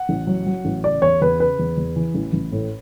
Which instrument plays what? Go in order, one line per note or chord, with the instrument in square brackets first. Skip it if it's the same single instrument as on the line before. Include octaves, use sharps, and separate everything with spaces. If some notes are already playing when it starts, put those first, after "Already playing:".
Already playing: [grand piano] F#5
A1
F#3
F#3
A1
C#3 D5
E2 C#5
E2 B4
C#3 B4
E2
E2
E3
A1
A1
A2